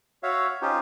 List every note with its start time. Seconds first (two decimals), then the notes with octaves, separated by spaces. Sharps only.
0.23 F#4 C#5 E5 F5
0.62 C#4 D#4 F4 G4 C5